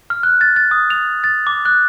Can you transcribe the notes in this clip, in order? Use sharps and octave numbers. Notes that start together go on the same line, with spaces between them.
F6
F#6
A6
A6
D#6
F7
A6
D6
F#6